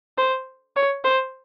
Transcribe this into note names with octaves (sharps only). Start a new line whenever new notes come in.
C5
C#5
C5